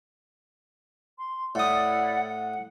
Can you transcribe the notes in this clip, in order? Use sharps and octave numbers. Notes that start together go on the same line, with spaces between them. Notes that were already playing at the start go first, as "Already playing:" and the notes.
C6
A2 E4 D5 F#5 D#6
F#5